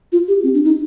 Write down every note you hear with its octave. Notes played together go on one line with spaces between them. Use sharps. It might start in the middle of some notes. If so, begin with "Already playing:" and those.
F4
G4
C4
D4
D#4